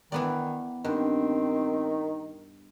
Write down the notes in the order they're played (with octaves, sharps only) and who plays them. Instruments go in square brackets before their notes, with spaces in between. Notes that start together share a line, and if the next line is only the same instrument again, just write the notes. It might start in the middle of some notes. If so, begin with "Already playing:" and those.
[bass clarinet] D#3 [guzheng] E3 B3 D5
[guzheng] G2 [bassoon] D#3 [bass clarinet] C4